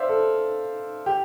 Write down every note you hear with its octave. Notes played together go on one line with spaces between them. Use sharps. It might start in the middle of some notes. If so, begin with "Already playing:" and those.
Already playing: C5 D5 E5 F5
A4
G4